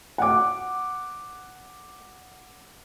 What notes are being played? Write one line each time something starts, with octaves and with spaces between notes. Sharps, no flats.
F#5 D6